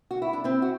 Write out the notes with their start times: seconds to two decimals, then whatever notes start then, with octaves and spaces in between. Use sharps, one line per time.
0.11 F#4
0.22 E4
0.33 D4
0.44 C4 E4
0.62 F#4